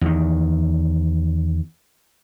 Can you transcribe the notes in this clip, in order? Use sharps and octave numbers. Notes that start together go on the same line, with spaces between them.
E2 D#3